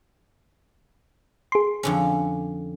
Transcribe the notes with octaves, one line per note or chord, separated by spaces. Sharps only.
G#4 C6
F2 D3 C#4